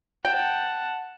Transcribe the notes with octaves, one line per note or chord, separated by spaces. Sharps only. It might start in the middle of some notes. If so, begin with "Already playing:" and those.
F#5 G5 A5